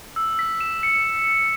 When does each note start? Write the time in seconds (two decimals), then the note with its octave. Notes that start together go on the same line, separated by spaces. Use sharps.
0.16 E6
0.39 B6
0.60 E7
0.83 C#7